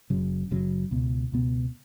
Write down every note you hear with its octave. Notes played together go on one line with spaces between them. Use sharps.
F#1 F#2 C#3 F#3
F#1 F#2 C#3 F#3
C#2 B2 B3
C#2 B2 B3